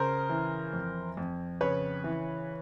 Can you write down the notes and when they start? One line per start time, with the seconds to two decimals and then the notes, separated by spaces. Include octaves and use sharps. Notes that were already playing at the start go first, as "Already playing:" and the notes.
Already playing: C#3 A#4 C5
0.30 E3
0.73 F2
1.17 F2
1.61 C#3 B4 C#5
2.04 E3